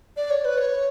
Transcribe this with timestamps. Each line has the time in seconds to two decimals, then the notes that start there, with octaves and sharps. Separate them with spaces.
0.17 D5
0.30 C#5
0.45 B4
0.58 C#5